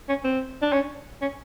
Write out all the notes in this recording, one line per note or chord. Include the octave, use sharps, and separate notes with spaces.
C#4
C4
D4
C#4
C#4